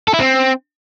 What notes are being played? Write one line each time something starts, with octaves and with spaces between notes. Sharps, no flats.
A4
E4
C4